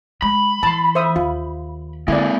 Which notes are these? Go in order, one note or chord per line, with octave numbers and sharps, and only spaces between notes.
G#3 B5
E3 A5 C6
C5 E5 D#6
D#2 F4
D3 G#3 A#3 E4 D5